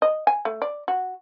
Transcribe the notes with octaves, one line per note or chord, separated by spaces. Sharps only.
D#5
G#5
A3
D5
F#4